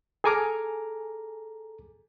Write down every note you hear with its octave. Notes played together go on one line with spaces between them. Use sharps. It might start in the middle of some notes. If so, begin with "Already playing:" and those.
G#4 A4 G#5 A#5 D6 F6